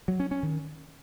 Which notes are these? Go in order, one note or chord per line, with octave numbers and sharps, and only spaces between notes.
F#3
C#4
C#4
D#3